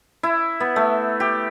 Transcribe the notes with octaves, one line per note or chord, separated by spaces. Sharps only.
E4
B3
A3
G4